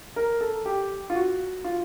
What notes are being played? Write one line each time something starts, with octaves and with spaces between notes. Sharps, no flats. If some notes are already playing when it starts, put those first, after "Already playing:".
A#4
A4
G4
F4
F#4
F4